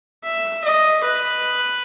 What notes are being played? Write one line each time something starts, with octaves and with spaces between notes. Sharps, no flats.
E5
D#5
B4